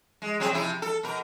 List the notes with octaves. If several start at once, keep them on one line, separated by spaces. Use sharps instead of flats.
G#3
F#3 C4 G#4
C3 F3 E4
A4
B2 A#4